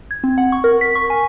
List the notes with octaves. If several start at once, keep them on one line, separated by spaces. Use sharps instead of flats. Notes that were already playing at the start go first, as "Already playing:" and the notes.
G#6
C4
F#5
C#6
A#4
B6
C#6
G#5